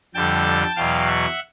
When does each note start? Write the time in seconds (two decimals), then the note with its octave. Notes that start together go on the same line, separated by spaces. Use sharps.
0.14 F2 D3 G3 G5 A5
0.76 E2 B2 F#3 F5 G5
1.08 E5 F#5